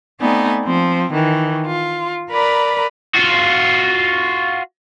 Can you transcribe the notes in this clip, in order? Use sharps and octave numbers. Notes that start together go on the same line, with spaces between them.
A3 B3 C4 D#4 D5 G#5
F3 C4
D#3 E3
F4
A#4 B4 D5 A#5 B5
F4 F#4